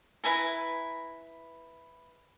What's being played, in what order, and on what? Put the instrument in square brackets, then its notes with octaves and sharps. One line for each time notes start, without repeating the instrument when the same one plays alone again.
[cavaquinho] E4 B4 G#5 A#5